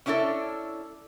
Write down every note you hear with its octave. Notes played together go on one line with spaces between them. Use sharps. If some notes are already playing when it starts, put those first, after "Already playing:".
C#4 D4 E4 F#4 A4